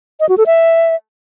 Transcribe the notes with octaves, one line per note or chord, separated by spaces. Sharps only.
D#5
F#4
A4
E5